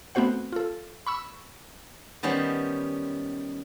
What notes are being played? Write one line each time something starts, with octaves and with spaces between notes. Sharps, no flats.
A3 B3 C4 F#4 C5 F#5
F4 A4
B5 C#6 E6
D#3 G3 B3 C#4 C5